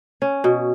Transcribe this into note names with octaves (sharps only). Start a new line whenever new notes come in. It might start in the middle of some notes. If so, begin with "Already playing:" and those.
C#4
B2